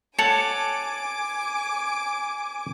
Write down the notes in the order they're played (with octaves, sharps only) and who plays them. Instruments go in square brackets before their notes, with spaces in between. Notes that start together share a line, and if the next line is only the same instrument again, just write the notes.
[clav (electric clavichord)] A4 C#5 F#5 [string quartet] G#5 D6 [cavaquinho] A5